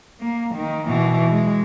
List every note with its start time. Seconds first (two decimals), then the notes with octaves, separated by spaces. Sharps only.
0.20 A#3
0.55 D#3
0.87 B2 E3
1.32 G#3